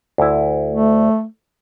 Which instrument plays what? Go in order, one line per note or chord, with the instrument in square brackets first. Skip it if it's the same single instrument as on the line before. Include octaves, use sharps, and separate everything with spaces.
[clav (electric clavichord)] D2 E4
[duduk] A3